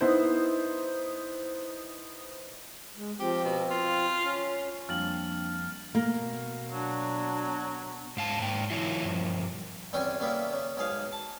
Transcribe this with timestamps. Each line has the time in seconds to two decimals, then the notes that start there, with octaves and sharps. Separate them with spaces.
0.01 B3 D#4 E4 C5
2.97 G#3
3.20 F3 C4 G4
3.45 B2
3.70 F4
4.23 C#4
4.89 F2 G3 A#3 D4 F6 A6 F#7
5.95 B2 A#3
6.71 F#3 D4
8.17 G#2 F5 A5
8.40 G#2 A#3 G5
8.70 E3 F#3 E4 F4
9.04 G2 F3
9.93 E2 G3 C4 C#4 G5 G#5
10.20 C#3 G3 A#3 B3 E4
10.53 C#3
10.77 B1 G#2 G#4 F5
11.12 A5